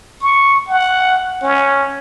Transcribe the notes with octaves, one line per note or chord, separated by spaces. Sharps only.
C#6
F#5
C#4